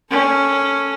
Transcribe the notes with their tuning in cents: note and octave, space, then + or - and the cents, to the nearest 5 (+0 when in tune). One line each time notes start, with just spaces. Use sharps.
C#4 +0 A4 +0